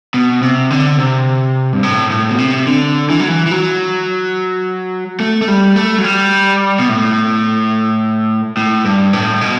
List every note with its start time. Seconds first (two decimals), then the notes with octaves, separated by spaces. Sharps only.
0.14 B2
0.42 C3
0.70 D3
0.99 C3
1.73 G2
1.83 A2
2.11 A2
2.29 B2
2.38 C3
2.67 D3
3.10 E3
3.19 F#3
3.28 E3
3.46 E3
3.51 F#3
5.20 A3
5.42 A3
5.48 G3
5.76 A3
5.98 F#3
6.04 G3
6.79 B2
6.89 A2
8.57 A2
8.85 G2
9.13 A2
9.41 B2